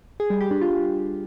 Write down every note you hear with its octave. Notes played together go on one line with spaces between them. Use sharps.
G#4
G3
G4
D4
F4